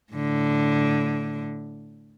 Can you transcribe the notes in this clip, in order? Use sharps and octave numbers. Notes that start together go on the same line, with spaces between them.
A2 D3